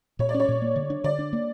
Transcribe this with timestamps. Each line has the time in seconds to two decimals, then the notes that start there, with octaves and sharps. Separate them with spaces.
0.19 A#2 C#5
0.29 D5
0.34 C#4
0.40 C#5
0.49 A#2
0.62 A#3
0.76 D3
0.90 D4
1.04 D3 D5
1.19 D4
1.33 A#3